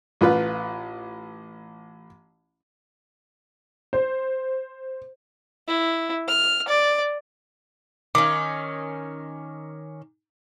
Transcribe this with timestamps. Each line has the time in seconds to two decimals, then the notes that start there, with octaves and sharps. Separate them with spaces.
0.21 A1 F4 B4
3.93 C5
5.68 E4
6.28 F6
6.68 D5
8.15 D#3 C#4 D6